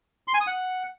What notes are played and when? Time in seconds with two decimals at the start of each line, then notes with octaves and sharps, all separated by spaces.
0.28 C6
0.34 G#5
0.40 D#6
0.47 F#5